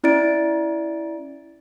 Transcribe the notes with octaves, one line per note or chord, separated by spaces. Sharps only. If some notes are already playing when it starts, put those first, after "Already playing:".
C#4 E4 D5 A6 D7